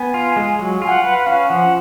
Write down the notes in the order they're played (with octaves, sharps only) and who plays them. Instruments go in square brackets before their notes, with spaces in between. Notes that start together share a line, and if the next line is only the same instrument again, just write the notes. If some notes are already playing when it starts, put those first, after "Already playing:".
Already playing: [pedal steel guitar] B3 [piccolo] G#5
[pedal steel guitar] F4
G#3
F#3
[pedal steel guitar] F4 [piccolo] G#5
[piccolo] F#5
[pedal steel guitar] B4 [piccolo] F#5
[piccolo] F#5
[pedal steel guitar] C#4 [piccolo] F5
[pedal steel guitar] F3 [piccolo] F#5